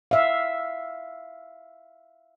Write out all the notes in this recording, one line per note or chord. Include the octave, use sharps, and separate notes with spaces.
E5 F5